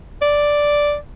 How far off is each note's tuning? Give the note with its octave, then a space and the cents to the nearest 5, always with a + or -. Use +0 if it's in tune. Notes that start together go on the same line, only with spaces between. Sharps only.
D5 +0